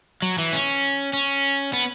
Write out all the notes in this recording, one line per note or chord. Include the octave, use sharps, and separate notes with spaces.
F#3
E3
C#4
C#4
B3